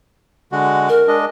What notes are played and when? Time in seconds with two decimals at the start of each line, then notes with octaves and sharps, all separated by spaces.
0.52 D3 G#3 F#4
0.89 A#4
1.08 G#3 D4 D#5